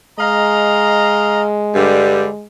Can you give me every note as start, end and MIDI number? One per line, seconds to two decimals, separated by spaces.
0.19 2.47 56
0.19 1.44 75
0.19 1.44 77
0.19 1.44 82
1.76 2.28 43
1.76 2.28 50
1.76 2.28 55